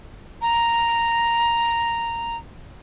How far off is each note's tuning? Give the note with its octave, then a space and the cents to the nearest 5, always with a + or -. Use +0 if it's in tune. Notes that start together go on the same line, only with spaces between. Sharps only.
A#5 -5